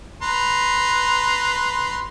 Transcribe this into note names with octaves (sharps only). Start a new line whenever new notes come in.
B4 A#5 C6